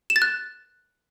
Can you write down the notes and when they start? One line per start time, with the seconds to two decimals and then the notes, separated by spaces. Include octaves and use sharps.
0.10 E7
0.16 A6
0.22 F#6